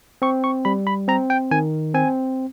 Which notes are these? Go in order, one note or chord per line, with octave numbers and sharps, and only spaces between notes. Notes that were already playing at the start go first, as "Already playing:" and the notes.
C4 C#6
C#6
G3 B5
B5
C4 A#5
G5
D#3 G#5
C4 G#5